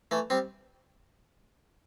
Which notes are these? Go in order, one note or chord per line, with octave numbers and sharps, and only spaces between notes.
E3 A3
G3 C4